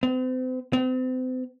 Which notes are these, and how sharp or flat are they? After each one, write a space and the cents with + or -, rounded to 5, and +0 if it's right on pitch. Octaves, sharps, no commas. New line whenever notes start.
C4 -40
C4 -40